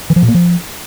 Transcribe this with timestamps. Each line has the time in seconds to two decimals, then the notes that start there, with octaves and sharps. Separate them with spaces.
0.10 E3
0.16 F3
0.22 A#2
0.28 A#3
0.34 F3